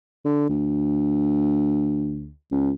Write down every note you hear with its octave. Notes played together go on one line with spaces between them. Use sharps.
D3
D2
C#2